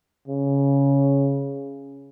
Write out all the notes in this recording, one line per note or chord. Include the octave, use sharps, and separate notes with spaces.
C#3